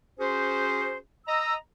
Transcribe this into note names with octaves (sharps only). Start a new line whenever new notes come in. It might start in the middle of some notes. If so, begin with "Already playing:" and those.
C#4 F#4 G#4 C5
D#5 A#5 E6